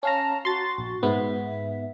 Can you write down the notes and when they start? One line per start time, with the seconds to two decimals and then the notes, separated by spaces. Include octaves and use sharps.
0.03 C#4 F5 A5 A#5
0.45 F#4 C6 A6
0.78 A#1
1.03 G#2 B3 E5